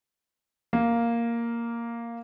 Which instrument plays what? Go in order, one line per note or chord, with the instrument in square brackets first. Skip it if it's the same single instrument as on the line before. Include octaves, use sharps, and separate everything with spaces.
[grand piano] A#3